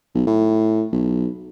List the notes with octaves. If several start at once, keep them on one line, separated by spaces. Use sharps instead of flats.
B1
A2
B1